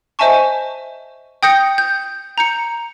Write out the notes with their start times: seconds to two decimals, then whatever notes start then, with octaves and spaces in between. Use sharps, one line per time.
0.19 C5 D#5 E5 G#5 A5 C#6
1.43 G5 D#6 G6 A#6 C#7
1.78 G6
2.38 A#5 G6 C#7